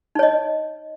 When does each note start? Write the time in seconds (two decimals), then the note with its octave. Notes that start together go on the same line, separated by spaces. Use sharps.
0.15 D#4
0.19 C#5
0.23 D#5